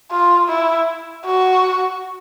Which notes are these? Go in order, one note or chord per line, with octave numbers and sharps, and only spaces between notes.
F4
E4
F#4